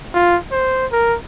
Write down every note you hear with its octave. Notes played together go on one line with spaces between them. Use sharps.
F4
C5
A#4